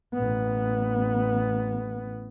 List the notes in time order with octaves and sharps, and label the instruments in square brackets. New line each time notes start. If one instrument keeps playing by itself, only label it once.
[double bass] A1 B3